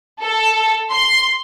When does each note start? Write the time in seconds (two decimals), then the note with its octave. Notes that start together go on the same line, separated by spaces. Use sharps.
0.21 A4
0.90 C6